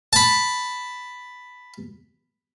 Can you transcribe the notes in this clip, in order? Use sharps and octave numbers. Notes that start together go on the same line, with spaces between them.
A5 B5